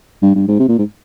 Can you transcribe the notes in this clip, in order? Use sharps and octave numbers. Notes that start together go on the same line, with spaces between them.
G2
G2
G#2
C3
A#2
G#2